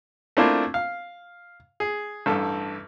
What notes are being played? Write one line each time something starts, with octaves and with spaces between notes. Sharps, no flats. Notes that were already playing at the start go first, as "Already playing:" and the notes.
A3 A#3 C4 D4 E4 F4
F5
G#4
A1 G2 A4